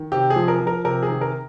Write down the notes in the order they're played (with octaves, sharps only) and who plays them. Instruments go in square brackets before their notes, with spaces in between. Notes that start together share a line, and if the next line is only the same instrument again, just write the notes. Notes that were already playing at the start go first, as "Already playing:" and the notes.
Already playing: [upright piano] D#3
C3 G4
G#4
F3
A#4
F3
A#4
C3 A#4
G#4
D#3
A#4